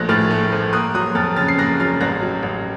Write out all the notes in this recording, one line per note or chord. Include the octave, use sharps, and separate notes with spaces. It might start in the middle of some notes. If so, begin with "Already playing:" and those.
Already playing: A#1 F3 A3 F#6 A#6
A2 F6 A6
A3
F3
A#3 D#6 F#6
F#3 D#6 F#6
F2 F6 A6
C#3 F6 A6
C7
A#3 F#6 A#6
F#3 F6 A6
A1 F#6 A#6
F#3
A1